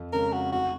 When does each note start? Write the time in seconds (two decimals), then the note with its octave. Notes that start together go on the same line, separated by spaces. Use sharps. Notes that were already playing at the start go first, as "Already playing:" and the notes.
Already playing: F2
0.13 C#3 G#3 C#4 A#4
0.33 F#4
0.52 F1 F#4